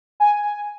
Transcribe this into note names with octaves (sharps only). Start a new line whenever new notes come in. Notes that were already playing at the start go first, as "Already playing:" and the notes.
G#5